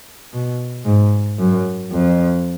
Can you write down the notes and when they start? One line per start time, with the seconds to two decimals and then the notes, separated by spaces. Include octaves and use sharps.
0.33 B2
0.86 G#2
1.39 F#2
1.91 F2